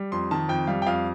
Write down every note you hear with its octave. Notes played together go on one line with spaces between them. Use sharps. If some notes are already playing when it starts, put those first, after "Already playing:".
Already playing: G3
F2 C6
D#3 A5
F2 G5
G3 F5
G5
F2 F5